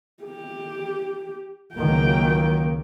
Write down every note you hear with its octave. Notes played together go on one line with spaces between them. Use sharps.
G4
C#2 D#3 F#3 A#3 G5